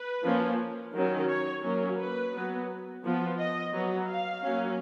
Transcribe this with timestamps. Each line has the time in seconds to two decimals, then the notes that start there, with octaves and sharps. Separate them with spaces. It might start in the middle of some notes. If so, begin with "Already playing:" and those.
Already playing: B4
0.23 F3 A#3 C#4
0.94 D#3 F#3 C#4
1.28 C#5
1.64 F#3 A#3 C#4
1.98 B4
2.34 F#3 B3
3.04 F3 B3
3.39 D#5
3.73 F#3 B3
4.08 F5
4.44 F#3 A#3 C#4